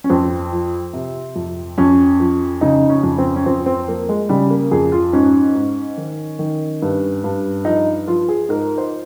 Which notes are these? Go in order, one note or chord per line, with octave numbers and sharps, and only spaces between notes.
C#4
F2 C4
F3
C3
F2
F2 C#4
F3
C#3 D#4
C#4
F2
C4
C#4
F2 C4
C4
F3 A#3
G#3
C#3 G3
A#3
F2 G#4
F4
G#2 C#4
G#2
D#3
D#3
G2
G2
F3 D#4
F3 F4
G#4
G#2 A#4
C5